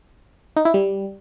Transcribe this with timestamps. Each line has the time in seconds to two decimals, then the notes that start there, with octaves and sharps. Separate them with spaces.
0.56 D#4
0.65 E4
0.74 G3